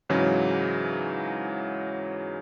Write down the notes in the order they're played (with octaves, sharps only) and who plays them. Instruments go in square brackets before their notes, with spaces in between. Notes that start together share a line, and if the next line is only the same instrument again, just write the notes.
[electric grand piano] G#2 C#3 E3 F#3